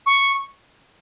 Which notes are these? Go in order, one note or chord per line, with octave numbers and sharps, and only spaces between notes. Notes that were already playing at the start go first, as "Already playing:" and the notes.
C#6